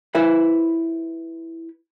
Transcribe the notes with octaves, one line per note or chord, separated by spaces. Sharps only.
E4 B4 C5 E5